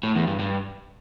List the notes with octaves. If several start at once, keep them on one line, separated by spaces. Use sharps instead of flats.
A2
E2
G2
G2